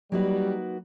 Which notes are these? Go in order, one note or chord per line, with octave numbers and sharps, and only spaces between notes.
F#3 G3 A#3 D#4 F#4 B4